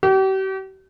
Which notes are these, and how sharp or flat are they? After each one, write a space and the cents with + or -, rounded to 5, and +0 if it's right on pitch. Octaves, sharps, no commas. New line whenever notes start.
G4 -40